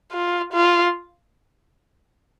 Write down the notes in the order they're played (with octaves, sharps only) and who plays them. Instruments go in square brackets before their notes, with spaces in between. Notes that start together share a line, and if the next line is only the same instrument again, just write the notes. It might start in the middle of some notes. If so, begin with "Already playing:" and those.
[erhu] F4
F4